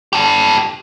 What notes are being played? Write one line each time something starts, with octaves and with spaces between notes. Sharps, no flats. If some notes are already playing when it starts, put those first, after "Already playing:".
G4 A4